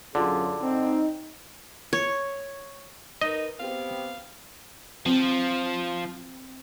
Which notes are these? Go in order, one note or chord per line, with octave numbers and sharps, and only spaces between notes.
F#2 D3 F4 G#4
C4 D#4
C#5
D#4 A#4 B4 D#5
B3 C4 G4 F5
F3 C4